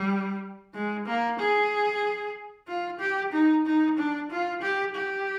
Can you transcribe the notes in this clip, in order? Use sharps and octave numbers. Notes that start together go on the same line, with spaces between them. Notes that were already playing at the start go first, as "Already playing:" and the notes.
Already playing: G3
G#3
A#3
G#4
F4
G4
D#4
D#4
D4
F4
G4
G4